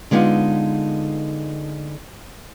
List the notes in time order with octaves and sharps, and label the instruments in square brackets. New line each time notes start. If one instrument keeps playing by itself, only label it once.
[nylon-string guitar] D3 G#3 B3 D#4 F4